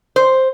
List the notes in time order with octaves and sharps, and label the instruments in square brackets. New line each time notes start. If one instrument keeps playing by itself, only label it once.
[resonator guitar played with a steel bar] C5